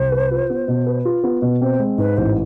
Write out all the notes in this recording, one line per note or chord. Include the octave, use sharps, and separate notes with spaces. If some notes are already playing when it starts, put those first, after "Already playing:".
Already playing: C2 C5
B4
F4
B3
B2
B4
F4
B3
B2
C4 C5
G#3
G#2 B4
A1 C5